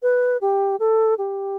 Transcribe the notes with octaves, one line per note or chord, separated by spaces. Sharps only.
B4
G4
A4
G4